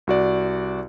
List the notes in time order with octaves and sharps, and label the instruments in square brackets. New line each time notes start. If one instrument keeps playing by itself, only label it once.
[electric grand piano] C2 F#4 D5